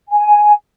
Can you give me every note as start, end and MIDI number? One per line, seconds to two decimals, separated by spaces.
0.09 0.51 80